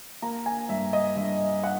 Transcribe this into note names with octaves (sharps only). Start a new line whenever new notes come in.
A#3 A#5
G#5
G2 E5
D#5
G2 E5
F#5